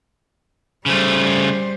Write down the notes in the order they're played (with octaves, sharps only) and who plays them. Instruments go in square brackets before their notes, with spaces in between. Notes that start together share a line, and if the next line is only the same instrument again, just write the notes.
[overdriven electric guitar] C#3 A3 [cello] G3 C5